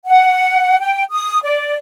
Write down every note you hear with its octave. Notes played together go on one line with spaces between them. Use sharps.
F#5
G5
D#6
D5